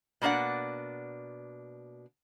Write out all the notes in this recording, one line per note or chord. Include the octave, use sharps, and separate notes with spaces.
B2 A#3 D4 D5 F#5